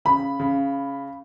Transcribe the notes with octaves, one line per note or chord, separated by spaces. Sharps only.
C#3 B5
C#3